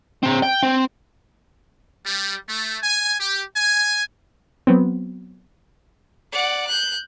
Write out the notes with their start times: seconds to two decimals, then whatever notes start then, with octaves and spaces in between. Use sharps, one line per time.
0.23 C4 A#5
0.42 G5
0.62 C4
2.06 G3
2.49 A3
2.83 G#5
3.20 G4
3.57 G#5
4.67 F#3 B3 C4
6.32 D5 F#5
6.67 F#6 G6